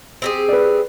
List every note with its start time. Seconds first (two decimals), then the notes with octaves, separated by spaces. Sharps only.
0.22 C4 G4 G#4
0.48 B4 D5